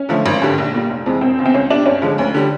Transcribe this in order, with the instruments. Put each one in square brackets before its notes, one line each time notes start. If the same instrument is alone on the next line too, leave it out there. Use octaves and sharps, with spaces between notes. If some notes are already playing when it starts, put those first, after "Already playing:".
Already playing: [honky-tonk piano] C#4
[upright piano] D3 F3 A3
G#1
G2 D3 G3
A#1
A#2 G3
F1
F2 C3 E3 G#3
[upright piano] E1 [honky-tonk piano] C4
[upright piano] E2 C#3
[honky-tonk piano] C4
[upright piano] C#2 [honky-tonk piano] C#4
[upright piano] B2 G3 [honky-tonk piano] D4
[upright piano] G2 [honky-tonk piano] C#4
[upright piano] D3 F3 G#3
[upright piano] D2 [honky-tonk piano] C#4
[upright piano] D3 G3